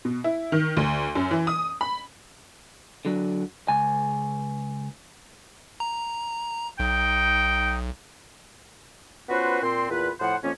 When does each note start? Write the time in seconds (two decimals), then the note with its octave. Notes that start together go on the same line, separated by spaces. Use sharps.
0.05 B2
0.24 E4
0.52 D#3
0.77 D2
1.15 F#2
1.31 E3
1.47 D#6
1.81 B5
3.05 D3 F#3 D4
3.68 C#2 G#5
5.80 A#5
6.80 B1 D#4 G5
9.29 B3 C#4 F4 F#4 B4 C5
9.62 A#2 C4 C6
9.90 E2 A#2 F4 B4
10.20 A2 F3 F4 C5 F#5
10.43 F2 F3 A#3 C#4